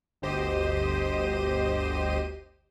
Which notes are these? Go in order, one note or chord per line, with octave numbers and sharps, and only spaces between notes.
G1 D2 G4 C5 D#5 D#7